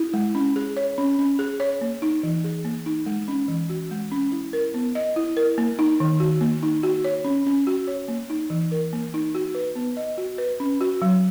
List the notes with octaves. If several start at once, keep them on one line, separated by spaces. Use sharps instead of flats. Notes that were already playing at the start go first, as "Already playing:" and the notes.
Already playing: E4
G#3
C#4
G#4
C#5
C#4
C#4
G#4
C#5
A#3
D#4
E3
G#4
A#3
D#4
G#3
C#4
E3
F#4
G#3
C#4
E4
A#4
B3
D#5
E4
A#4
A#3
D#4
D#3
F#4
A#3
D#4
F#4
C#5
C#4
C#4
F#4
C#5
A#3
D#4
E3
A#4
A#3
D#4
F#4
B4
B3
D#5
F#4
B4
C#4
F#4
F#3